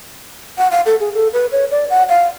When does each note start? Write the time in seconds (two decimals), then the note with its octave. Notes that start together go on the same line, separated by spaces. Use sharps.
0.58 F#5
0.71 F5
0.86 A4
1.00 G#4
1.14 A4
1.33 B4
1.52 C#5
1.71 D5
1.90 F#5
2.09 F5